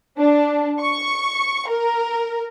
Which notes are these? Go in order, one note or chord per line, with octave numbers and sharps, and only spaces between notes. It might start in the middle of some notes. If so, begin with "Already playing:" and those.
D4
C#6
A#4